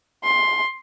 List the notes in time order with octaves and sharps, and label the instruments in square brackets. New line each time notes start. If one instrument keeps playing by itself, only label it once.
[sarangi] C6